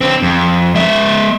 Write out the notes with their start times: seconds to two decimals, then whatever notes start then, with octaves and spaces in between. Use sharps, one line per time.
0.01 D3 C4
0.22 F2
0.75 G#3 E5